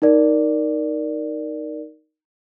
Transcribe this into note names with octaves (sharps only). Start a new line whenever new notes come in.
D#4 A#4 D5